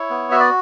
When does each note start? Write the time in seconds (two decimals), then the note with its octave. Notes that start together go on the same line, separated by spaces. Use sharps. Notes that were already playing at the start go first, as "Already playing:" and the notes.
Already playing: E4 C#5
0.10 B3
0.31 F#4 E5
0.40 D5